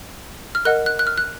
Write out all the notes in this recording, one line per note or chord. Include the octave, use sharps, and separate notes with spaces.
F6
A#4 D#5 F#5 F#6
F#6
F#6
F6
F#6